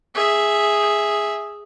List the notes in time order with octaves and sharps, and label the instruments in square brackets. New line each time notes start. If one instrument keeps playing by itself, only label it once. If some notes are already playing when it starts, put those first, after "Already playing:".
[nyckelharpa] G#4 E5